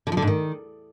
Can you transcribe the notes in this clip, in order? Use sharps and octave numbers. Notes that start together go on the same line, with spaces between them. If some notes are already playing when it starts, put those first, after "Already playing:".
D3
F3
D3
G#2
D#3